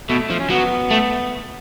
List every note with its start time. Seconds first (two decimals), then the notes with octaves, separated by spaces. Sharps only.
0.09 B2 A3
0.30 F3
0.39 C#4
0.50 F#3 B3
0.90 A3